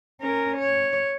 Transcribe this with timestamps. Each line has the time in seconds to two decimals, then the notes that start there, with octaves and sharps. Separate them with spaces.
0.21 C#4 A#4
0.58 C#5